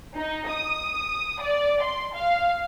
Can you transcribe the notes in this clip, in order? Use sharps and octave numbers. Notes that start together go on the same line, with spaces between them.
D#4
D#6
D5
C6
F5